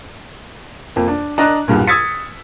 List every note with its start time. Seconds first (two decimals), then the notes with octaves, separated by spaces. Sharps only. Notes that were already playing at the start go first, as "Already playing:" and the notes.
0.96 F2 A#3
1.08 D4
1.38 D4 D#5 A#5 F#6
1.68 E2 G2 A#2
1.87 D#6 E6 G#6 A6 B6 C#7